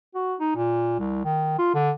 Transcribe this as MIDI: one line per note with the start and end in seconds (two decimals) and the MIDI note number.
0.15 0.35 66
0.40 0.54 63
0.55 0.96 46
1.00 1.21 36
1.25 1.54 51
1.58 1.73 65
1.74 1.91 50